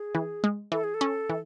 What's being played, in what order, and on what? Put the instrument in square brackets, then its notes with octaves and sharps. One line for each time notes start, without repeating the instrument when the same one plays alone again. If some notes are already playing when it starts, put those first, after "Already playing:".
Already playing: [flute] G#4
[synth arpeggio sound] E3
G#3
[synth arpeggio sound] E3 [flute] A4
[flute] G#4
A4
[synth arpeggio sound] C#4
E3